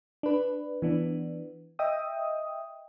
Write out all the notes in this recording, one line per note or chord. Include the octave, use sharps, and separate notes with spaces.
D4 B4
E3 B3 D4
D#5 E5 G5 D#6